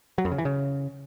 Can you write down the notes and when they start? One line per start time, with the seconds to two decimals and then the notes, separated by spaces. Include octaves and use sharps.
0.18 F#3
0.25 F2
0.32 C#3
0.38 E3
0.45 C#3